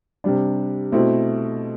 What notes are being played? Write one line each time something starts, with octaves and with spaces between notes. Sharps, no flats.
C3 G3 D4
B2 A3 C4 E4